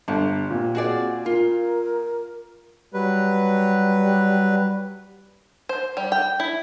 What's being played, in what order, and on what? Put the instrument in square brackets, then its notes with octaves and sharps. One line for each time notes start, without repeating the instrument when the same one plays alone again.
[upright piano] G1 [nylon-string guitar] G3
[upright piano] A#2 [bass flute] C4
[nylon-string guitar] F#4 G#4 D5
[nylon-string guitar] F4 [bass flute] A#4
[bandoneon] F#3 B4 [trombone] G3
[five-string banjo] C5
G3
G5
E4